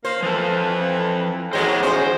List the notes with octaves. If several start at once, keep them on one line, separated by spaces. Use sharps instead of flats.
A#3 C5
E3 F3 A4
G#2 D#3 F#3 G#3 C5 C#5 F#5
E2 G#3 C#4 C5